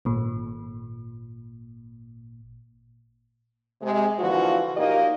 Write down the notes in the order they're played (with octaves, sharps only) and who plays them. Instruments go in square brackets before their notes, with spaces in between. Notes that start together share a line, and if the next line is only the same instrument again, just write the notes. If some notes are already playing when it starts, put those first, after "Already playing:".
[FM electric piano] G#1 A#2
[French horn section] C3 G#3
A#2 D3 E3 F3 F#4
A#2 A#3 D#4 G4 D#5